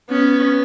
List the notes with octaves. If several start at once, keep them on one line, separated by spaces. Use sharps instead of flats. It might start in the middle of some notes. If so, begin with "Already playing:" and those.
B3 C#4